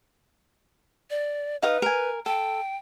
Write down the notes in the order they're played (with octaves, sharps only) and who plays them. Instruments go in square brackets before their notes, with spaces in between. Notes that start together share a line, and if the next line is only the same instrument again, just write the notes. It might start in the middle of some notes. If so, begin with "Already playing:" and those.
[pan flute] D5
[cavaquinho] D#4 F5 D#6 [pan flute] B4
[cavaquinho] A#4 G#5
[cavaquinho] A4 [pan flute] G5